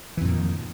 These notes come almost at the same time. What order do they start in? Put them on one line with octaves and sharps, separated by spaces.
E3 F2 A#2 D#3